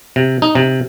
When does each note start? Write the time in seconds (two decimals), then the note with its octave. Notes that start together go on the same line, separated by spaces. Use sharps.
0.16 C3
0.42 D#4
0.55 C3